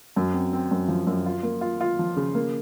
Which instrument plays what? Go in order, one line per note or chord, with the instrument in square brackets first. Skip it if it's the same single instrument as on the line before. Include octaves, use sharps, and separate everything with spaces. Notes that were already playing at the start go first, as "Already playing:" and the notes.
[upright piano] F#2
C4
C4
F#2
F3
F#2
F4
A#3
F4
F4
F3
C#3
A#3